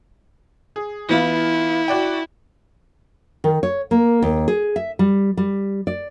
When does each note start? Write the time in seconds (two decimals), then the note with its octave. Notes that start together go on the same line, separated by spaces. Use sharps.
0.76 G#4
1.09 E3 B3 E4 F4
1.88 F#4 D5 G5
3.44 D#3
3.63 C#5
3.91 A#3
4.22 D#2
4.48 G#4
4.76 E5
4.99 G3
5.37 G3
5.87 D5